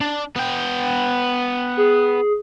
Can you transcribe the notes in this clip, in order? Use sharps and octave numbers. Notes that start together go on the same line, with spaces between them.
D4
B3 G5
G#4